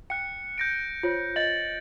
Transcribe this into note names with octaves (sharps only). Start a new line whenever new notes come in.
G5 F#6 C#7
G6 A#6 D7
F4 C5 C#5
D#5 A6 F#7